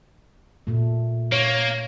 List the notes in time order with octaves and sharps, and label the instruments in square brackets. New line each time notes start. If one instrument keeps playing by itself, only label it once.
[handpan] A#2 A3
[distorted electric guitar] A#3 [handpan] C#5